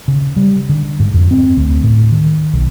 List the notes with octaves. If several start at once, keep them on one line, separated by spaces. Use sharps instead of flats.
C#3
G3
D3
G#2
F2
C4
D2
A2
D#3
B1